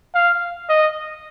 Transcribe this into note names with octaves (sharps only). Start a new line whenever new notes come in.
F5
D#5